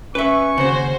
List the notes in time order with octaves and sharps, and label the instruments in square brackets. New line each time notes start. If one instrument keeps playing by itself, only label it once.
[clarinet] C#4 [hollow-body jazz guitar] B4 E5 [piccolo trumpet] C#6
[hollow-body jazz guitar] D#2 C#3 [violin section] F#4 C5